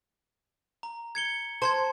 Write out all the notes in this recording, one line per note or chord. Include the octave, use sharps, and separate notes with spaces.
A#5
G#6 C#7 G7
C5 A5 C6 G#6